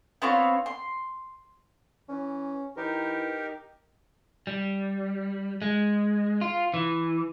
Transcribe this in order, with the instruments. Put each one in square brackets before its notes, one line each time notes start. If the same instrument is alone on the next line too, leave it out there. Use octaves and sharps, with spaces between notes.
[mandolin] B3 C4 F4 C#5
C6
[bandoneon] E3 [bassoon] C#4
[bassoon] E3 [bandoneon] D#4 G4 A#4
[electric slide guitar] G3
G#3
F4
E3